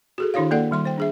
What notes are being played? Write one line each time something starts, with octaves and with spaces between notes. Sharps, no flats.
F#4 G#4 A4
D#3 D4 E4 F#4 C#5 F5
A#3 A4 D5 F#5
D#3 G3 C6
C5 G5
D4 G#4 E5